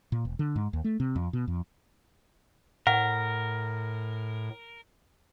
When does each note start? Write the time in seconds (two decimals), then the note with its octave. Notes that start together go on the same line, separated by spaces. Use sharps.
0.12 A#2
0.25 E1
0.39 D3
0.56 G#2
0.73 D#2
0.84 A3
1.00 C3
1.16 F2
1.33 B2
1.48 F2
2.87 A2 A#4 F#5